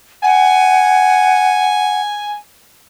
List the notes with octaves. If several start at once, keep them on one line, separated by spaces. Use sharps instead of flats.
F#5 G#5